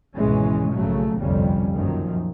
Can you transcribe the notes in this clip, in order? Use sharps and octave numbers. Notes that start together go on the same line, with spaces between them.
G#1 C#2 B2 E3 G#3 C#4
A#1 C#3 F#3 A3
G1 C2 F2 C3 G3 C#4
F#2 A#2 D#3 F3